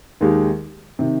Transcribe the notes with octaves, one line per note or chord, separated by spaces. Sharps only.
D#2 D#3 G#3 D#4 G4
C3 D#3